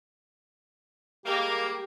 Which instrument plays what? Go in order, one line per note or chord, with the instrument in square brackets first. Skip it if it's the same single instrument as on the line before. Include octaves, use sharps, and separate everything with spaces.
[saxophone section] G3 G#3 A#3 [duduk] G4